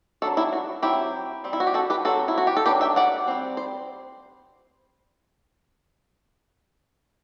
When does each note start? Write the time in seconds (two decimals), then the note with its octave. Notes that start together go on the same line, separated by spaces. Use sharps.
0.22 F#3 B3 D4 F#4 A4
0.37 E4 G4
0.53 F#4
0.83 F#3 C4 E4 G4
1.44 G3 C4
1.53 E4
1.60 F#4
1.67 G4
1.74 F#4 A4
1.90 G4 B4
2.05 F#3 C4 F#4 A4
2.28 E4
2.38 F#4
2.47 G4
2.57 A4
2.66 F#3 A3 D4 G4 B4
2.81 E5 G5
2.96 D5 F#5
3.28 G3 C4
3.57 C5